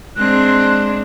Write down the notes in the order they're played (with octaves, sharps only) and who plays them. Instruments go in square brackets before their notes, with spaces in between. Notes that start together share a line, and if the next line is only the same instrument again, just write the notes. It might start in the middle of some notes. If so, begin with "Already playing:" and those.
[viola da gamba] G#3 C4 D4 [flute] F#6